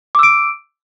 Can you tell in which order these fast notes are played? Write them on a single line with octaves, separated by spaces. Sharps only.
D6 E6 D7